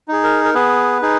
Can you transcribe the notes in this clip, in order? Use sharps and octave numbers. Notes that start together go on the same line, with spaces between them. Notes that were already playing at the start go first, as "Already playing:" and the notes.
D#4 G#4
A#4
A#4
B3 G#4 B4
D#4 G#4